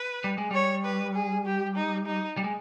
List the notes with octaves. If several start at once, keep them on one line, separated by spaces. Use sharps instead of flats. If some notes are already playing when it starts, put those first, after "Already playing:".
Already playing: B4
G3
G#3
G3 C#5
B4
G#4
G4
D#4
D#4
G3
G#3